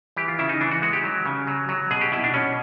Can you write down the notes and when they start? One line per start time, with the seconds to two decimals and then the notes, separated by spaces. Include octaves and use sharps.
0.17 E3 G4
0.28 F4
0.39 C#3 E4
0.49 D#4
0.61 E3 D4
0.71 F#4
0.82 G#3 F#4
0.93 G4
1.04 F#3
1.26 C#3
1.47 F#3
1.69 F#3
1.91 B2 G#4
2.01 G4
2.12 B2 E4
2.24 D4
2.34 B2 C#4